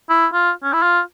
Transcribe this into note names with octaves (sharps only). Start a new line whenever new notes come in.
E4
F4
C#4
E4
F4